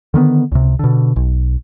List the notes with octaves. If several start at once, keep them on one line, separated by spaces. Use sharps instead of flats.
D3 D#3 A#3 B3
C#2 C3
B2 D3
B1